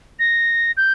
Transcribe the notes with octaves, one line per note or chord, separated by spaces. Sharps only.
A#6
G6